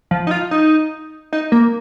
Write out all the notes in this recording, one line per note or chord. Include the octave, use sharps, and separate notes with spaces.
F3
D#4
F4
D#4
D#4
A#3